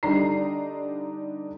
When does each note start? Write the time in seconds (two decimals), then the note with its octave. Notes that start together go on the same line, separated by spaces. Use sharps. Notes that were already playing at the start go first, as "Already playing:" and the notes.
0.03 D3 G3 D4 D#4 A#5 C7